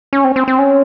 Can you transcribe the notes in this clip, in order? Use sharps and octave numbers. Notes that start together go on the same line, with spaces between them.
C#4
C4
C4
C4
C#4